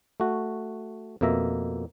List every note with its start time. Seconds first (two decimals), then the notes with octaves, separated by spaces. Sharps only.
0.20 A3 F#4
1.21 F2 B2 A#3 E5 A#5